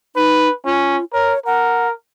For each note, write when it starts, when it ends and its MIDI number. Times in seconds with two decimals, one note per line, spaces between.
0.16 0.49 63
0.16 0.52 71
0.65 0.97 61
0.65 1.04 65
1.13 1.33 70
1.13 1.39 73
1.46 1.91 70
1.46 1.87 78